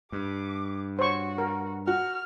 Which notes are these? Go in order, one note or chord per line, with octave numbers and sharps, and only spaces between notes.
G2 D6
F#4 C5 C#5 C#6
A#4
F#4 F6